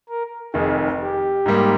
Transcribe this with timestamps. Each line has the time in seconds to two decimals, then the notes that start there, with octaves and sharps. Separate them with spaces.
0.09 A#4
0.54 F1 F2 D#3 G#4
1.00 G4
1.46 G#2 G3 A#3